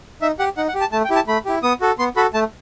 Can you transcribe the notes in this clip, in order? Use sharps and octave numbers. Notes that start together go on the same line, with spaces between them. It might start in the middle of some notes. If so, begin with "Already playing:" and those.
D#4 E5
G4 F#5
D#4 F#5
F#5
G4
A5
A3 A5
G5
E4 G4
A5
A3 B5
E4 G4
B3 D#6
F#4 A4
B3 C6
F#4 A4 B5
A3 A5